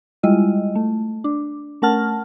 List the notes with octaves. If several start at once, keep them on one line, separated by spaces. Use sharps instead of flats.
G3 G#3 E4 F4 D#5
A3
D4
A3 C#4 A#4 F#5 A5 F6